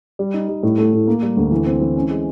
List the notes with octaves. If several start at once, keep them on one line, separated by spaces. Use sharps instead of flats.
G3
D#4
G3
A2
A3
A2
A#3
G3
D2
E3
C4
E3
C#4
G#3